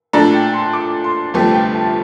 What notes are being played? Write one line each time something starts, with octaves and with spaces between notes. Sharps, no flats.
A#2 A3 D4 A4 A#5
G5
C6
D6
C6
G1 F2 C3 F3 A3 A5
G5
A5